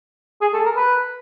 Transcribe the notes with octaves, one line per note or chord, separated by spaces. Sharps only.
G#4
A4
A#4
B4